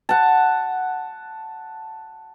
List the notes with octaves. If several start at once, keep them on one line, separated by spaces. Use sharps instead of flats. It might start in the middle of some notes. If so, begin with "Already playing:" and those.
F#5 A5